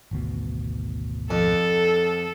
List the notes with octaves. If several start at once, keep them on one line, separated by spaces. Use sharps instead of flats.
G#1 D2 B2
F2 A4